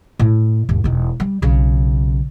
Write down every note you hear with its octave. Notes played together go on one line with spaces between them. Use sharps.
A2
D#2 G#2
E1 D#4
G3
B1 C#3